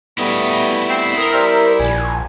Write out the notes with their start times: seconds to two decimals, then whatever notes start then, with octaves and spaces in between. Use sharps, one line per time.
0.18 G3 A3 B3 E4 D#5
0.90 C4
1.18 A#4 D#6
1.34 G3 C5 E5
1.80 A#1 G#5